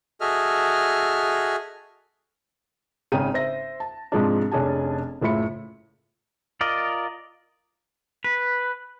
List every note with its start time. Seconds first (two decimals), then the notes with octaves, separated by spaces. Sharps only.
0.21 F#4 G#4 A4 D#5 E5 F6
3.12 G#1 C#3 D#4 G#4 G5 D#7
3.34 C5 E5 A#6
3.80 A5
4.12 G#2 C3 F3 G#3 D4
4.52 F1 C#4 D4 G#4 G#5 A5
5.22 F#1 A2 F4 E5 B5 C#7
6.61 F4 A#4 D5 D#5
8.24 B4